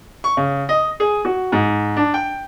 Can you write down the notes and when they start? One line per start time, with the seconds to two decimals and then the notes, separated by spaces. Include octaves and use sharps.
0.24 C#6
0.37 C#3
0.69 D#5
1.00 G#4
1.25 F#4
1.52 G#2
1.97 D4
2.14 G5